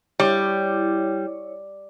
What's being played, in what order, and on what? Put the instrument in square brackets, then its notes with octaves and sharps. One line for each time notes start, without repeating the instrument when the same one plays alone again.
[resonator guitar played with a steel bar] G3 [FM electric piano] E4 C#5